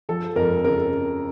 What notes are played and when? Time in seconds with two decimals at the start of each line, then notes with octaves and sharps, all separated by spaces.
0.09 F3 A4
0.36 F2 A#4
0.64 C#3 A#4